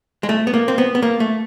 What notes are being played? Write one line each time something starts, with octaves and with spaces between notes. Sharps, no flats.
G#3
A3
B3
A#3
C4
B3
B3
A#3
A3